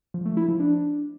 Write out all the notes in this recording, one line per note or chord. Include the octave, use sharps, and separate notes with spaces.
F3
A3
E4
F3
D4